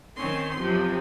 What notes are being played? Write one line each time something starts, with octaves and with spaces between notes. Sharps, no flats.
D#3 C4 C#4 C6
F#2 C3 F3